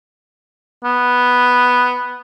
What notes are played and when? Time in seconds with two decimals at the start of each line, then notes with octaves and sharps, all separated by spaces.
0.84 B3